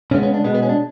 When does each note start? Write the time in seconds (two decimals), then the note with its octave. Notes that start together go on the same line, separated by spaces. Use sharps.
0.11 C#3 G#3 B3 C#4
0.23 C#4
0.34 D4
0.44 B2 G#3 B3
0.55 B3
0.62 C#4
0.69 D4